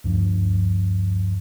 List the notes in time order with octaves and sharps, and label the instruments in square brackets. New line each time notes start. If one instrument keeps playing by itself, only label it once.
[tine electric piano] D2 G2 F3